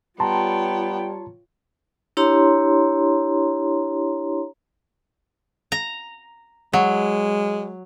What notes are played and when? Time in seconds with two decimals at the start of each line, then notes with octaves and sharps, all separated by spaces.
0.20 G3 B3 F4 C#5 G5 A5 A#5 C6
2.17 D4 E4 G4 C#5 A#5 C6
5.72 A#5
6.73 F#3 G#3